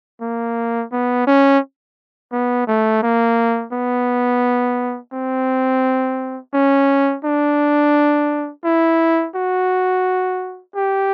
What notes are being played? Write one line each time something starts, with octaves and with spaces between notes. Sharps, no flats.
A#3
B3
C#4
B3
A3
A#3
B3
C4
C#4
D4
E4
F#4
G4